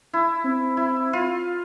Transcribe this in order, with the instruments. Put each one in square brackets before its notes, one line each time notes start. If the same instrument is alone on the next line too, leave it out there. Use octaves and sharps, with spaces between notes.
[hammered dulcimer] E4
[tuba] C4
[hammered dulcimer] E4
F4